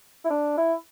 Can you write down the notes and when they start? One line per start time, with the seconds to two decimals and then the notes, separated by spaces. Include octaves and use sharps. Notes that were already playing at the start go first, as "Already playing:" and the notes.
0.25 E4
0.30 D4
0.58 E4